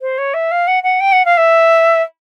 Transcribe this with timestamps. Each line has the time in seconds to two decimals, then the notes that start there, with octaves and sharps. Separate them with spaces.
0.01 C5
0.18 C#5
0.33 E5
0.51 F5
0.67 F#5
0.83 F#5
1.00 G5
1.12 F#5
1.25 F5
1.37 E5